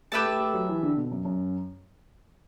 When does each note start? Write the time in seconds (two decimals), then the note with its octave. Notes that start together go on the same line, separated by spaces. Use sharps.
0.12 A3 G4 B4 E5 A5
0.26 A3
0.40 A3
0.54 F#3
0.69 E3
0.83 D3
0.97 B2
1.11 F#2
1.25 F#2